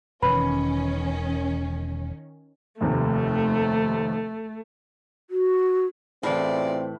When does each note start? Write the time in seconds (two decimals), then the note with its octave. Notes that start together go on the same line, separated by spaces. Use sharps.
0.22 E1 E2 D#3 C#4 B4 B5
2.81 F1 D#2 C3 A3
5.30 F#4
6.23 A2 C#3 E3 C4 F4 D5